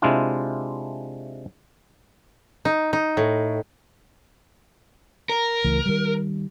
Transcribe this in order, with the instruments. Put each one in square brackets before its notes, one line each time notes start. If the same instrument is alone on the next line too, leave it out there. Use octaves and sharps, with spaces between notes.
[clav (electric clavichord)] C3 G#3 D4 E4 F4
[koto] D#4
D#4
A2
[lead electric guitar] A#4
[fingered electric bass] C#2 E3 A3
D#3 G3